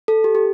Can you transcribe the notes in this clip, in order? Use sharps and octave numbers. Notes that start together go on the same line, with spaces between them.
A4
G4
G4